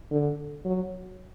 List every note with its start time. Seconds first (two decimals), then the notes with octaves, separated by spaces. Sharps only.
0.11 D3
0.65 F#3